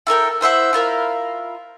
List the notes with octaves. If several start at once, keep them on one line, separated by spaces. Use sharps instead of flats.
E4 A4 A#4 G5
E4 C5 E5 F#5
E4 F4 A#4 B5